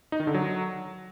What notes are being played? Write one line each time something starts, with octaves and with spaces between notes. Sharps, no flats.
D#4
D#3
D3
F#3